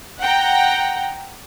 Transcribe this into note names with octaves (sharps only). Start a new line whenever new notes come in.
F#5 G5 A#5